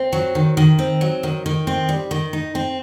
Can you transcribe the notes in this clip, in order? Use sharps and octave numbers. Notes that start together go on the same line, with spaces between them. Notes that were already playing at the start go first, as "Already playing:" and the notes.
Already playing: C4
F#3
D#3
D#3
C4
F#3
D#3
D#3
C4
G3
D#3
D#4
C4